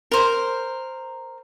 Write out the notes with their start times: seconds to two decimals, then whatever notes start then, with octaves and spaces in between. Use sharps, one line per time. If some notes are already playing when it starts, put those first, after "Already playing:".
0.11 A#4 C5